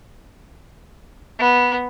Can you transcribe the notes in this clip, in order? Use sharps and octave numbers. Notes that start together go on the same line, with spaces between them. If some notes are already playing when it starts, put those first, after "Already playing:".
B3